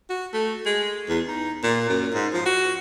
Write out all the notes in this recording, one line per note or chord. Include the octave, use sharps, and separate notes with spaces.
F#4
A3
G#3
E2
D#4
A#2
F#2
G#2
F3
F#4